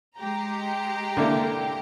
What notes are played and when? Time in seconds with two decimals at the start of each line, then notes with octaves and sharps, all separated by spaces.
0.18 G#3 G4 A#5
1.17 D3 A#3 E4